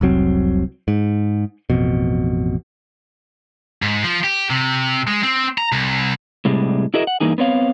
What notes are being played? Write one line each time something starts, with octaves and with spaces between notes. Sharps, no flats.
F1 C2 F#3 C4
G#2
A1 F2 B2
G#2
F3
G4
C3
G#3
C4
A#5
C2
A2 C3 G3 G#3
E4 F#4 G#4 A#4 D#5 E5
F#5
G2 E3 A#3 D#4 G#4
B3 C4 C#5 F5